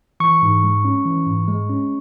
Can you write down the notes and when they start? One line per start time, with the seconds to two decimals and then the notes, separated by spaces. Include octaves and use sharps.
0.20 E3 C#6
0.42 G#2
0.63 G#3
0.85 C#4
1.05 E3
1.26 G#2
1.48 G#3
1.69 C#4